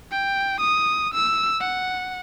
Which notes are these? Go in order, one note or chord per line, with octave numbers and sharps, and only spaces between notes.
G5
D#6
E6
F#5